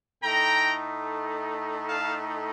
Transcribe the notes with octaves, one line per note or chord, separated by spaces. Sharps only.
A2 A3 D#4 G5 A#5
F5 A5